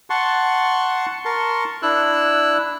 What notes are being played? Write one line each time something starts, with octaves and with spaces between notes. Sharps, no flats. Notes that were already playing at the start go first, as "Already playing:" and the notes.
F#5 A5 C6 C#6
A#4 A5 C6 C#6
D4 E4 E6 F#6